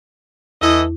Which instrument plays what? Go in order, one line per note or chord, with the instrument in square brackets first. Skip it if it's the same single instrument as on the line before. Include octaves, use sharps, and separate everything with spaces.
[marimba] E2 E4 [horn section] E3 A4 D#5